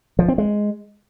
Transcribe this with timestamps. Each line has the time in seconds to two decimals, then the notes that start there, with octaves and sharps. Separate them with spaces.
0.19 F3
0.28 C4
0.38 G#3